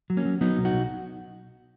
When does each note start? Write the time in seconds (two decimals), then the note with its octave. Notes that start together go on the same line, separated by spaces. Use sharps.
0.10 F#3
0.17 A#3 C#4
0.25 F#3
0.41 F#3 B3 D#4
0.57 B1
0.65 D#4 F#4
0.73 B1